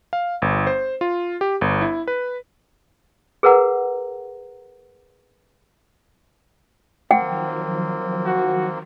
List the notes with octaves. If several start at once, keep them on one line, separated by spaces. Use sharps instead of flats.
F5
G1
C5
F4
G4
G1
E4
B4
G#4 A#4 B4 F#5 A#5
D#3 F3 F#3 A#3 C4 F#5 G5
F#4